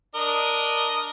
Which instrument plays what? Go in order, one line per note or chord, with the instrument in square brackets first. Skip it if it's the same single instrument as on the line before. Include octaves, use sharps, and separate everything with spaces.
[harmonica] D4 A#4 D#5